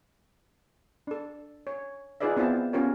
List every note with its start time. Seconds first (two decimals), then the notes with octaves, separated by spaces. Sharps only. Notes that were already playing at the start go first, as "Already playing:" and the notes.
1.07 D4 A4
1.67 C#5
2.20 D#4 F4 G#4 B4 D5 E5
2.37 B3 C4 E4 F4 C5 A5
2.73 B3 C#4 F4 G4 A#4 C#5